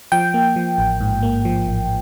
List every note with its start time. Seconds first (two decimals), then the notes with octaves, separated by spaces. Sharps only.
0.12 F3 G5
0.34 A#3
0.56 F3
0.78 A1
1.01 G#2
1.23 A#3
1.45 F3
1.68 A1